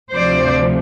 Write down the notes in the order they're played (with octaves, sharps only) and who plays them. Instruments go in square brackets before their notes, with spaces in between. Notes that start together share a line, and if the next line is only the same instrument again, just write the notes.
[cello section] D2 C3 F3 C5 D5